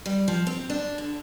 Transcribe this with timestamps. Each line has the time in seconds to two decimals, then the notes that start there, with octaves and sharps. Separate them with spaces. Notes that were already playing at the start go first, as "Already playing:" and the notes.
0.06 G3
0.28 F3
0.47 C4
0.70 D4
0.98 D3